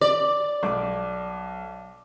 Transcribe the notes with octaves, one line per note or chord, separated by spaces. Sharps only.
D5
B1 D6